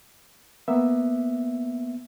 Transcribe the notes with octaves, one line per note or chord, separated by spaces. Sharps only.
A#3 B3 E5